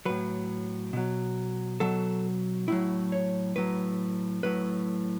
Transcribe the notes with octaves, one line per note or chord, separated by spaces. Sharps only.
A2 F#3 B4
B2 F#3
B2 F#3 A4
A2 F#3 E4
C#5
A2 F#3 B4
A2 F#3 B4